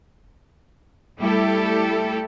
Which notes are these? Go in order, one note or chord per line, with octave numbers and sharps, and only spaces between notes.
G3 A3 E4 G4 A4